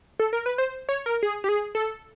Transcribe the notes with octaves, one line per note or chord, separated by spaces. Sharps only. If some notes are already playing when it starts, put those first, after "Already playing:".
A4
A#4
B4
C5
C#5
A#4
G#4
G4
G#4
A4